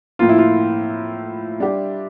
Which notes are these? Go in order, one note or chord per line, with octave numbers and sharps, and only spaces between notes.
A2 F3 A#3 F4
E4
F4
G3 D4 G4